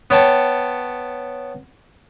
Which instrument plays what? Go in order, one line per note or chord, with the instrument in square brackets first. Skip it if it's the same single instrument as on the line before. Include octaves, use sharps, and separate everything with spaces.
[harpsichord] B3 C#5 G5 A5